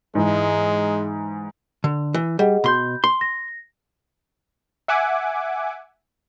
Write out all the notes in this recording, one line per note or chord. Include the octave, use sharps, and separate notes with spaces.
G#2 E3 G#3
D3
E3
G3 G#4 D#5 F#5
B2 B5 C6 G6
C6
A#6
E5 F#5 G#5 D6